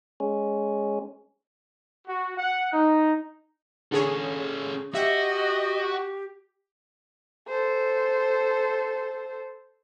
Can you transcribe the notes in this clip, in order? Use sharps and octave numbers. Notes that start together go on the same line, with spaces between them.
G#3 C#4
F#4
F#5
D#4
D3 C#4 G#4 A4 C#5
F#4 G4 D#5 E5
A4 C5